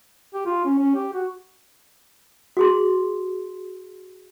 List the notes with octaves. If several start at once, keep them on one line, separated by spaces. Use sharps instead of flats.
G4
F4
C#4
C#4
G4
F#4
F#4 G#4 C6